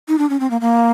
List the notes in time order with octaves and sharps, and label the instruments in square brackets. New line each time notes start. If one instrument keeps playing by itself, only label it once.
[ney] D#4
D4
C#4
C4
A#3
A#3